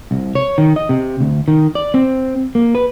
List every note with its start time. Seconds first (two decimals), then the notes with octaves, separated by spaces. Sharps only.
0.11 C2
0.35 C#5
0.58 D#3
0.76 D#5
0.89 C3
1.21 D2
1.48 D#3
1.75 D5
1.94 C4
2.55 A#3
2.75 B4